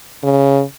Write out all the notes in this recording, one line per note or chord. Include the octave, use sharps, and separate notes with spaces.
C#3